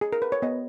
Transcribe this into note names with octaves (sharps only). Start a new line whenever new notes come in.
G#4
A#4
B4
C#5
B3 D#5